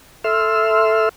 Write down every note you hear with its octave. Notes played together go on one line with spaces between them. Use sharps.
A4 E5 C6 E6 F6